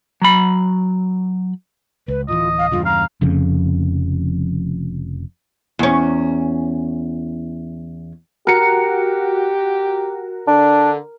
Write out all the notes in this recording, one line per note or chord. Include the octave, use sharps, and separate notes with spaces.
F#3 B5
C#2 B4
D1 E3 F4 D#5
F5
E2 G2 C#3 F4
F5 A#5
F1 F2 C#3
E2 C#4
F#4 G4 A#4 C#7
D3 D4